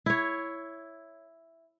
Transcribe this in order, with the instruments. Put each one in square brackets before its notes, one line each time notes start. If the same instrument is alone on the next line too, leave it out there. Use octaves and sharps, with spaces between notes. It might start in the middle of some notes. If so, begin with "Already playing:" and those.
[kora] E4 C#5